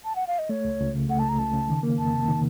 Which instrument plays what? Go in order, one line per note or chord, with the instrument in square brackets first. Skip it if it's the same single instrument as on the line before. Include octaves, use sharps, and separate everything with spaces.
[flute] A5
F#5
F5
D#5
[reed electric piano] A3 [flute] C#5
[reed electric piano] C#2
C#2
C#3
[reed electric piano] A3 [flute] F#5
[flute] A5
[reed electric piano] C#2
[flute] A#5
[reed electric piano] C#2 [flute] A5
[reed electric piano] C#3
D#3
A#3
[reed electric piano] F2 [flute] A5
[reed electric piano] C3
D#3